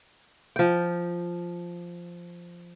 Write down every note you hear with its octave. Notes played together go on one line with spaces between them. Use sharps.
F3 G5